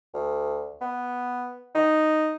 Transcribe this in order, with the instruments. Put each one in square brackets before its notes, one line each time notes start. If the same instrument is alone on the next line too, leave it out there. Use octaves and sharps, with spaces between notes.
[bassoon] D2
B3
D#4